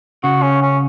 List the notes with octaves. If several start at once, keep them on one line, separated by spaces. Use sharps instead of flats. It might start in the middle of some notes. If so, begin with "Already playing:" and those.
C#3 F#4
C#4
C#4